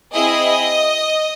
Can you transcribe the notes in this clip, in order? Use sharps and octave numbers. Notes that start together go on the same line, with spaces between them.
C4 E4 G#4 D#5